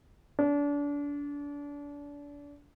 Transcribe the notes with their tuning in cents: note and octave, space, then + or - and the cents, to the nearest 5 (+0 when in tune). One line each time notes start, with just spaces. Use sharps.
D4 -30